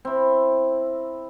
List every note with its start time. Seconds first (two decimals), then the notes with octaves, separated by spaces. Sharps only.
0.05 C4 E4